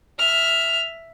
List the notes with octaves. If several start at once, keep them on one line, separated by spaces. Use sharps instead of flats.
E5 F6